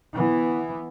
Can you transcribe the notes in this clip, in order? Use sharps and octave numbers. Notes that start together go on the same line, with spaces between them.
E3 B3